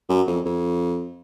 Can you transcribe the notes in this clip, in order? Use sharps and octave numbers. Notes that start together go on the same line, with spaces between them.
F#2
F2
F2